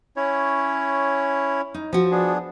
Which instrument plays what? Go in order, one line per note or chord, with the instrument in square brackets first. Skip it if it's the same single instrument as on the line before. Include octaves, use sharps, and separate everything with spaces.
[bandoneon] C#4 E4 C#5
[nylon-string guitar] D#4
F3 F#4
[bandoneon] B3 D4 G#4